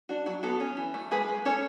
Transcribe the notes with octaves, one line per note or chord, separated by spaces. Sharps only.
D4 F#4
F#3 F#4
B3 F#4 A4
C#4
E3
A3
G#3 G#4 B4
G#3
C#4 A4 C#5